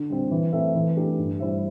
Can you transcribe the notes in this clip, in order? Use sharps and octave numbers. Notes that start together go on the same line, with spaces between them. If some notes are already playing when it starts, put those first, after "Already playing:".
Already playing: D3
G3 C4
E3
A3 C4 A4 E5
E3
A3 D4 G4
G2
G3 E4 C5 E5